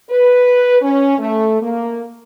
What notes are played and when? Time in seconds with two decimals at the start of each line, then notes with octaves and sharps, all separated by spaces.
0.10 B4
0.82 C#4
1.18 A3
1.61 A#3